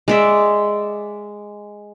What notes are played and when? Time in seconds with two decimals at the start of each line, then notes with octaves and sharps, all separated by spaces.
0.08 G#3 D5 E5